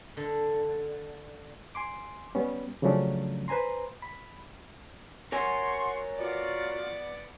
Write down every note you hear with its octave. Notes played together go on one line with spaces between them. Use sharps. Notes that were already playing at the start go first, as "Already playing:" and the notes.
D3
G#5 C6 D6
G3 B3 C#4
C#3 F3 F#3 A3 C#4 D4
B4 C5 G#5 A#5 C6
B5
A#4 C#5 F#5 G#5 C6 C#6
B3 F4 F#4 D5